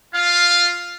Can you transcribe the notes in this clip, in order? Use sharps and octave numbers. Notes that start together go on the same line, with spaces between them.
F4 F5